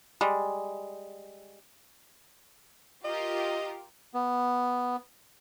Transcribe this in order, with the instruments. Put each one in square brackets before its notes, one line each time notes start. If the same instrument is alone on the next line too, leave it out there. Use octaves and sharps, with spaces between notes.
[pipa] G3 G#3
[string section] F4 G4 A#4 [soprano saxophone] D#5
[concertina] B3